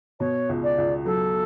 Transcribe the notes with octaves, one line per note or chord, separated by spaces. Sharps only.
B2 C#5
C#2
D5
C#2
F#3 A4